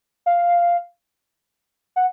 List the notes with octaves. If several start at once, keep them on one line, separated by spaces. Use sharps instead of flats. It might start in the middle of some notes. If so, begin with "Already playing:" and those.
F5
F#5